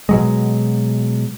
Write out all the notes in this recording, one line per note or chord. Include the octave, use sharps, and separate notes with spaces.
B2 F#3 G#3